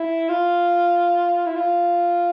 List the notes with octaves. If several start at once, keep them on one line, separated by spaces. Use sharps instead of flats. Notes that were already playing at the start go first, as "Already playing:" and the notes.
Already playing: E4
F4
E4
F4